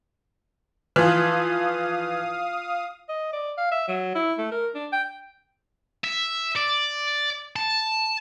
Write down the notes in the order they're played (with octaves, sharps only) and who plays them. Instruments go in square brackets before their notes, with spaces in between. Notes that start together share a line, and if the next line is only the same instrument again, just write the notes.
[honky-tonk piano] E3 F3 [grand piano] F4 [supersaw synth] F5 D#6
[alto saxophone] D#5
D5
F5
E5
F#3
E4
A3
A#4
D4
G5
[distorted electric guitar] E5
D5
A5